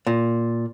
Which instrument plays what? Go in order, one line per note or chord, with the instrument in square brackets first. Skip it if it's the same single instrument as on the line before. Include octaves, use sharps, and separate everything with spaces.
[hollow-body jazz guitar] A#2